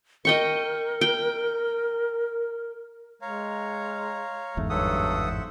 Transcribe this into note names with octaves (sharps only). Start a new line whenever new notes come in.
A#4 D#5 G5 C#6
G5
G#3 C#5 F5 A#5
G1 E2 G#2 A3
G2 F#3 A4 C5 E5 F#5 D#6